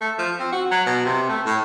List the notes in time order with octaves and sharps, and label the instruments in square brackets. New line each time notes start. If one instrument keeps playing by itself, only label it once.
[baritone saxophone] A3
F3
C4
F#4
F#3
B2
C3
A3
A2